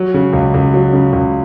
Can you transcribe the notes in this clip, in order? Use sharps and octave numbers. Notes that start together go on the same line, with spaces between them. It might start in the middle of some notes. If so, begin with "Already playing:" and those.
Already playing: F#3
C#3
C#2
C#2
F#3
C#3
C#2